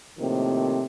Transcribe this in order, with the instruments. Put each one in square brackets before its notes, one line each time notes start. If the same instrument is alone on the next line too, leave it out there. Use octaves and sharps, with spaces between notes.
[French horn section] A2 C3 D#3 F3 A#3